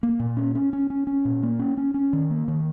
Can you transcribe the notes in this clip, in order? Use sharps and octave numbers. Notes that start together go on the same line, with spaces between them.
A#3
A#2
C#4
C#4
C#4
C#4
C#4
A#2
A#3
C#4
C#4
C#4
D#3
A#3
D#3